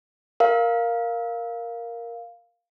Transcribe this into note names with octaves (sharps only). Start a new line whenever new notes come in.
A#4 F5